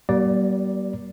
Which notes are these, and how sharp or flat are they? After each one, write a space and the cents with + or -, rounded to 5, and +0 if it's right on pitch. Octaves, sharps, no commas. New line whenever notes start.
G3 -40 A#3 +40 D5 +0